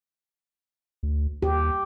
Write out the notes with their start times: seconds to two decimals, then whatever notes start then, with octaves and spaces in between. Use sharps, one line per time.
1.03 D2
1.42 D#2 G4